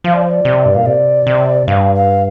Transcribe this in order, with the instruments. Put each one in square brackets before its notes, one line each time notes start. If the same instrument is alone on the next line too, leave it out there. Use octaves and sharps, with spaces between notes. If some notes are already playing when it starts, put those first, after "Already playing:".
[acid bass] F3 [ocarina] F5
[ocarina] D5
C5
D5
[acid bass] C3
G2
[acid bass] A#2 [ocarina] F5
[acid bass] C3 [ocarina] D5
[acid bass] C3
[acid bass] G2 [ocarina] F5
[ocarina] F5